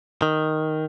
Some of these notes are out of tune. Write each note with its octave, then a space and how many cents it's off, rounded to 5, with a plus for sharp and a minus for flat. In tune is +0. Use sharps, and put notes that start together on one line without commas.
D#3 +0